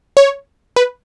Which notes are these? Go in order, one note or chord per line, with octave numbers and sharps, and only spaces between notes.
C#5
B4